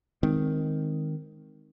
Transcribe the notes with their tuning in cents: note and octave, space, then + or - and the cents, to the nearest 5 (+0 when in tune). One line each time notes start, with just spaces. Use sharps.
D#3 +0 G#3 +0 C4 +0